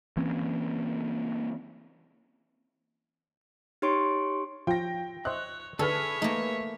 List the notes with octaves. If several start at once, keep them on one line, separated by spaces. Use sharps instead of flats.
E3 A#3 C4 C#4
D#4 G4 C#5 C6 C#6 D7
F3 F4 G5 A#6
C5 C#5 D#5 E5 F#6
D3 G#4 A4 B4 C#5 E5 F6
A3 A#3 D#4